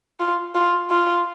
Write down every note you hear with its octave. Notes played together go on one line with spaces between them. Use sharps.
F4
F4
F4